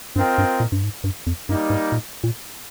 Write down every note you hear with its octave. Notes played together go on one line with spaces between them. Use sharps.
G2 C4 F4 A#4 D#5 G5
G2
A#2
G2
G#2
G2
F2
G2 G3 A#3 D#4
G#2
A#2
A#2